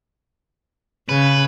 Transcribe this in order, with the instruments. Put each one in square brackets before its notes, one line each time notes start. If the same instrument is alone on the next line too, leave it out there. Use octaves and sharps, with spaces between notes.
[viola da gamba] C#3 [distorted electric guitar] B4